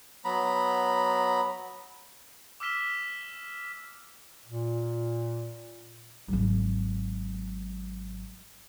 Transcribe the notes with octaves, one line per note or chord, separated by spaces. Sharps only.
F#3 B3 A#5 B5
D6 E6 F6 B6 E7 G7
A#2
G#1 F#3